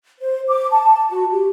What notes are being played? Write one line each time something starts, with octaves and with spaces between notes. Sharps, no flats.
C5
D6
A5
F#4
G4